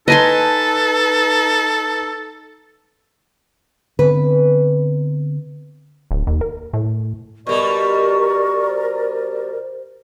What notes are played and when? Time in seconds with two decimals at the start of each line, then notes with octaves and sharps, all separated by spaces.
0.08 D#4 A4 B4 D#5 G#5 A5 C6
3.99 D3 B3 C4 B4
6.11 D1
6.27 D#2
6.41 A#4
6.73 A2
7.47 B2 G3 A#4 D5 C#6
8.69 C5